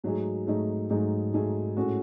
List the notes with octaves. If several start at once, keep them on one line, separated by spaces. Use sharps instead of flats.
G#2 F#3 A3 D#4 G#4
G#2 F#3 A3 D#4 G#4
G#2 F#3 A3 D#4 G#4
G#2 F#3 A3 D#4 G#4
A2 G#3 C#4 F#4 A4